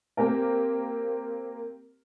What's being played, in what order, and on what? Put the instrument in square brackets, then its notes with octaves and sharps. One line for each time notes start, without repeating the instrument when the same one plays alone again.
[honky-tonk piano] A#3 C4 G4 A#4